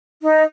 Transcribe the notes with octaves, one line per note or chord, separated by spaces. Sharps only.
D#4